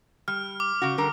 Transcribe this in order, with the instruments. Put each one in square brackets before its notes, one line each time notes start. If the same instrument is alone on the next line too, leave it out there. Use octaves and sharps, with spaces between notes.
[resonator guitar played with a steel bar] G3 [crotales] F6
[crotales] D6
[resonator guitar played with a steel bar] C#3 F#4
D3 G3 A#4